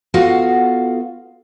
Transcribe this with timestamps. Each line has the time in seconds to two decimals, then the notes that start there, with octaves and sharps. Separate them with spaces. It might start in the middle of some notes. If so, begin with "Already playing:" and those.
0.14 B3 F4 F#4 A4 F5 F#5